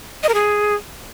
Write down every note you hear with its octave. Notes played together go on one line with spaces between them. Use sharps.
D#5
A#4
G#4